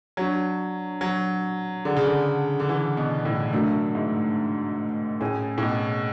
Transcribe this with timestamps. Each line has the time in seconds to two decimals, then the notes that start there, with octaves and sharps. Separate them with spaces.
0.17 F#3 D4 F#4 C#5
1.01 F#3
1.85 D3 D4 G#4 D5 F#5
1.96 C#3
2.07 D3
2.60 D3
2.69 E3
2.97 B2
3.25 A2
3.53 F#2 A3 D4 F#4
3.95 G#2
5.21 A2 C#4 G#4 C#5 G#5
5.58 A2
5.63 B2